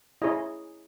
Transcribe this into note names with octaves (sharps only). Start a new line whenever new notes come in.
E4 G#4 C#5 D#5